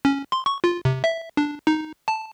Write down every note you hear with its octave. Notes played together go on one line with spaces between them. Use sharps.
C#4
C6
C#6
F4
C3
E5
D4
D#4
A5